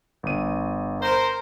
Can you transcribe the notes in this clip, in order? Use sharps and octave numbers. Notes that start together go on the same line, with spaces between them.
G1 D#7
A#4 C5